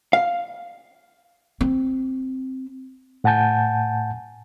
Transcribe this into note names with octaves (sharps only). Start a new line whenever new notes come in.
F5
C4
A2 F#5 G#5 A5 G6